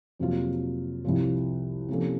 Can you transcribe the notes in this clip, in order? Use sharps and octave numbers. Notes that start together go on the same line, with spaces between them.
F2 C3 F#3 A#3 F4
C2 C3 F3
C3 F3 A#3 C#4 A4